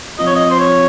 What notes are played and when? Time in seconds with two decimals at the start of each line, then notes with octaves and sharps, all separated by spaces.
0.19 F3 C4 F4 D#5
0.27 C#5
0.35 D#5
0.50 C5
0.59 C#5